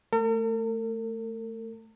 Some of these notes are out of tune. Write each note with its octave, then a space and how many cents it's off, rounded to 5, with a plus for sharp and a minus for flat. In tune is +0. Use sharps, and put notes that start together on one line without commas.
A3 +5 A#4 -45